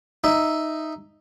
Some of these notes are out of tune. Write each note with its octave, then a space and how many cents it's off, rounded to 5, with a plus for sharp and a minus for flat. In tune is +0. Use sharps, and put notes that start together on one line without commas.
D#4 +0 E5 +0